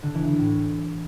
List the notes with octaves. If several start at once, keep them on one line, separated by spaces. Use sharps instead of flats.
D3
E3
E3
A2